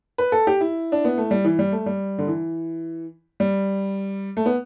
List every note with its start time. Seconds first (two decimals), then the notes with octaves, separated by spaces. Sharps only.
0.18 B4
0.32 A4
0.47 G4
0.61 E4
0.92 D4
1.05 B3
1.18 A3
1.31 G3
1.45 E3
1.59 G3
1.72 A3
1.86 G3
2.18 D3
2.28 E3
3.40 G3
4.37 A3
4.46 B3